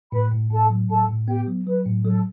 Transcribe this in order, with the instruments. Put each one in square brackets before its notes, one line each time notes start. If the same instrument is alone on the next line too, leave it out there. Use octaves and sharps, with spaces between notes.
[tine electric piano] A2 [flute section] B4 B5
[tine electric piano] A2
[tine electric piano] A2 [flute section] A4 A5
[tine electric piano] F#3
[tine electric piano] A2 [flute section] A4 A5
[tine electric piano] A2
[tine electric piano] B3 [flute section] G4 G5
[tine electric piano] F#3
[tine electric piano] F#3 [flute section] B4
[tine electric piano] A2
[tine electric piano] F#3 [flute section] A4